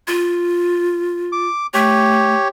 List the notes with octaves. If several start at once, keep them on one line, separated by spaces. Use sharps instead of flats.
F4
D6
A3 G4 C#5